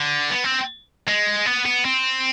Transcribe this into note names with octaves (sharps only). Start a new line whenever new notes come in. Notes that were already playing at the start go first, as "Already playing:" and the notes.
Already playing: D3
B3
C4
G#3
B3
B3
C4